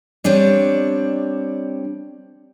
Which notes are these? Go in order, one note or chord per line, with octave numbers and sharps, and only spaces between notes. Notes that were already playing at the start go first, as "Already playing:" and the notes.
G3 C4 D4 C#5